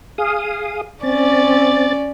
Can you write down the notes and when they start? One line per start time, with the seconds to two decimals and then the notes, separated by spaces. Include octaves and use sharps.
0.18 G#4 F5 D#6
1.03 C4 C#4 D5 A6